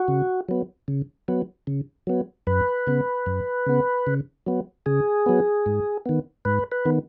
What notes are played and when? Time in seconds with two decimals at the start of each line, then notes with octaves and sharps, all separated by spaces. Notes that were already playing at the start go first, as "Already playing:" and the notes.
Already playing: F#4
0.08 C#3
0.49 F#3 B3
0.88 C#3
1.28 F#3 B3
1.67 C#3
2.07 F#3 B3
2.47 F#2 B4
2.87 C#3 B3
3.26 F#2
3.66 C#3 B3
4.07 C#3
4.46 F#3 B3
4.86 C#3 G#4
5.26 F#3 B3
5.66 G#2
6.06 D#3 B3
6.45 G#2 B4
6.72 B4
6.85 D#3 B3